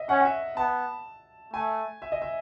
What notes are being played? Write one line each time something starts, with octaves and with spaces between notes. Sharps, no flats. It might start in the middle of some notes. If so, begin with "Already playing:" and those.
Already playing: D#5 E5
C#4 F#5
F#5
E5
B3 A5
A3 G#5
E5
D#5
E5